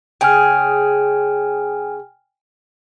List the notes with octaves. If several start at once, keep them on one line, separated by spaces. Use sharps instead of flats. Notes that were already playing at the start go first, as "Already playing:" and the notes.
C#3 G#4 G5 G#5 F6